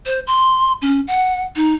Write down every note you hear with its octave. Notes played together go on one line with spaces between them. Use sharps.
C5
C6
C#4
F#5
D#4